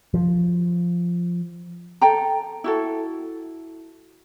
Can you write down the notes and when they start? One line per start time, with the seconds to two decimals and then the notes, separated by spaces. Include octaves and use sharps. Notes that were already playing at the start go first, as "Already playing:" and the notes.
0.14 F3
2.01 A4 G5 A#5
2.64 E4 F#4 A4